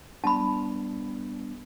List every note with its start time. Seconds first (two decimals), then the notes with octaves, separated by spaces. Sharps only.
0.24 G3 B3 D4 A5 B5